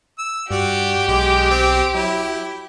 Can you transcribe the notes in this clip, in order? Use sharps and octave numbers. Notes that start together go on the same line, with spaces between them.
E6
G2 F#4 G4 D5
B1 G#3 G5 D6
C4
F#3 E4